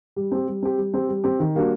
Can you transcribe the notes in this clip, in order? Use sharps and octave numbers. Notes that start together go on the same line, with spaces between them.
G3
C4 G4
G3
C4 G4
G3
C4 G4
G3
C4 G4
D#3
G3 A#3 D4 F#4